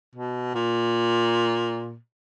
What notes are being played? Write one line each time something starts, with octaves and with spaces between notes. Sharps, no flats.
B2
A#2